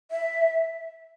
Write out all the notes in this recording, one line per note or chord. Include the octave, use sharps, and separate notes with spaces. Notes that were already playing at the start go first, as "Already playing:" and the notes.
E5